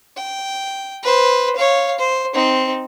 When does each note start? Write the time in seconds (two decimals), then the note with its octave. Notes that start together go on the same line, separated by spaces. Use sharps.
0.17 G5
1.03 B4 C5
1.56 C#5 F5
1.99 C5
2.34 C4 D#4